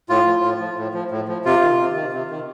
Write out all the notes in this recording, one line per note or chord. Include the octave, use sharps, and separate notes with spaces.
A2 F4
F3
A2
F3
A2
F3
A2
F3
C3 F4
D#3
C3
D#3
C3
D#3